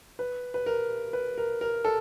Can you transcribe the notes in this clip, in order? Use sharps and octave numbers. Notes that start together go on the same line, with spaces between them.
B4
B4
A#4
B4
A#4
A#4
A4